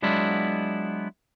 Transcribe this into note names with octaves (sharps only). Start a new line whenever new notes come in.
F#3 G#3 B3 D4 E4 F4